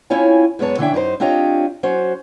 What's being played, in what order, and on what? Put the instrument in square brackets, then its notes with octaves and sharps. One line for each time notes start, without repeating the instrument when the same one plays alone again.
[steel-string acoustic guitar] C4 C#4 E4 F4 C#5 G#5
F#2 G#3 B3 C#5 A5
D3 E3 C#4 D4 E5 G5
F#2 D#4 A#4 C5
C4 D4 F4 G4 C#5 D#5
F#3 C#4 F#4 C5